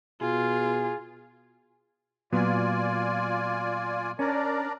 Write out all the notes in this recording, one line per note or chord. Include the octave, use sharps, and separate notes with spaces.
B2 F4 G#4
A#2 F#3 B3 F4 D5 G#5
C#4 D4 A#4 D5